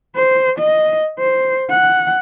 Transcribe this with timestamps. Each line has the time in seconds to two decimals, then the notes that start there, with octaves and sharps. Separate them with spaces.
0.16 C5
0.59 D#5
1.19 C5
1.70 F#5